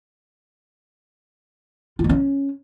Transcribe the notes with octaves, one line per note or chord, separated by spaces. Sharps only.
F4
A#3
C#4